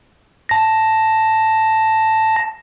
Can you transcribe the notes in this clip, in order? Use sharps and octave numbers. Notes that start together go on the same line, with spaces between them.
A5 A#6